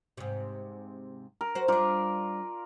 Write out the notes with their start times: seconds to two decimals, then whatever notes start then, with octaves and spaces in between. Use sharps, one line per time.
0.17 G#2 C3
1.41 A#4
1.55 F#4 C5
1.68 G3 D4 F4 A#4 D5